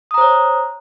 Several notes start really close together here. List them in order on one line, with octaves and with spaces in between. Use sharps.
D#6 A#5 C5 C#5